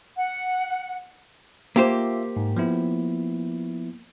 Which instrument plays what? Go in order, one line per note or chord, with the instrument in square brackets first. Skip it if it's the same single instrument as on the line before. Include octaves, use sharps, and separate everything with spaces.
[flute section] F#5
[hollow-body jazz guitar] A#3 G4 C5 [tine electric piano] F4 E5
[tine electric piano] G#2
F3 B3 E4